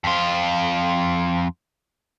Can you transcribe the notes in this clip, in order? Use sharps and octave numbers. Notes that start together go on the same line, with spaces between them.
F2 F4